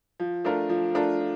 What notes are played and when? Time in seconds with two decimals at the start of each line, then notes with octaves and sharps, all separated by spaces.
0.20 F3
0.45 A3 D4 F4 A#4
0.69 F3
0.95 A3 D4 F4 A#4
1.20 F3